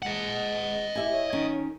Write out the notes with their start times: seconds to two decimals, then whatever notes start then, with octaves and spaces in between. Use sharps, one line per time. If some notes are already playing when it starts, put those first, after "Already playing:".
0.02 G#3 D#5 F#5
0.95 E4 G4 E5 G#5
1.12 C#5
1.33 D#3 C#4 A#4